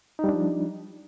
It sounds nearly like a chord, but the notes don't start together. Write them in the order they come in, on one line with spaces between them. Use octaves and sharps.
D#4 G3 D4 F3